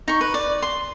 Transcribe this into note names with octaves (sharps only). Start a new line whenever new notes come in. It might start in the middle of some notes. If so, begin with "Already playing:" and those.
D#4 C#6
B4
D5
C6